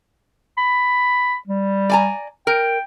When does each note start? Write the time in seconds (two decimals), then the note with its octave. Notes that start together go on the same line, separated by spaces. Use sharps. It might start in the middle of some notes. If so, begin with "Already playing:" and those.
0.57 B5
1.47 G3
1.90 D5 G#5 A#5
2.47 A#4 G5